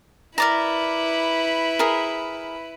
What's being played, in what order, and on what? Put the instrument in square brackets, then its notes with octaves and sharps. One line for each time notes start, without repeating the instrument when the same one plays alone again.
[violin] E4 B4 [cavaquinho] A#4 D5 A#5
[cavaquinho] G#4 A#4